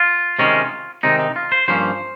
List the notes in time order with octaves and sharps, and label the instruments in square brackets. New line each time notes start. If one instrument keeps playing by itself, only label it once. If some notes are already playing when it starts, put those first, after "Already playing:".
Already playing: [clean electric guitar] F4
C3 D#3 G#3 C#4
C3 D#3 G#3 C4 D#4
D#4
F4
C5
G2 F3 A#3 C#4 C5